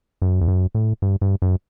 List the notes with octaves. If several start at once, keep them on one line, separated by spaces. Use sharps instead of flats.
F#2
E2
F#2
A2
G2
G2
F#2